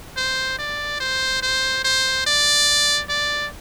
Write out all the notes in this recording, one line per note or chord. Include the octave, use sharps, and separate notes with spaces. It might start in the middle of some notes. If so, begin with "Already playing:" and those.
C5
D5
C5
C5
C5
D5
D5